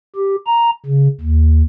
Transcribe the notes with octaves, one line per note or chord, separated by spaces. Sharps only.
G4
A#5
C#3
D#2